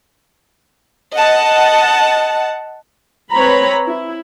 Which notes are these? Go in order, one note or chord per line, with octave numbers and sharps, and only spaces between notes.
D#5 F#5 A5
C4 B4 C#5 A#5 B5
E4